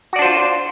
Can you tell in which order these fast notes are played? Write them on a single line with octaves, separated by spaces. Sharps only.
F#4 D5 D4 C5 F4